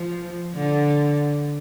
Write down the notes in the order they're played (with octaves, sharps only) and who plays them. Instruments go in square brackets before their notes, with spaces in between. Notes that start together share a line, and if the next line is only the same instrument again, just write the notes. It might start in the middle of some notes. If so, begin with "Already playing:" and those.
Already playing: [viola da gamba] F3
D3